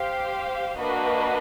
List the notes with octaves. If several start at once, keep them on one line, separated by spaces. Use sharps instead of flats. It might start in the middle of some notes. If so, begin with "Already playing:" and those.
Already playing: G4 C5 F5
A#3 D4 F#4 B4 D#5